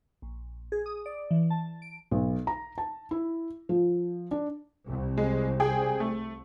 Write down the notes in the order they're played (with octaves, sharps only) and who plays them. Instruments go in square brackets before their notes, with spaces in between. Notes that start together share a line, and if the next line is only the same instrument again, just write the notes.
[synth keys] A#1
G#4
D#6
D5
E3
A5
D7
[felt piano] B1
A#5
A5
E4
F3
D4
[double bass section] C2
[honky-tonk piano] G#3
G#4 G5
A3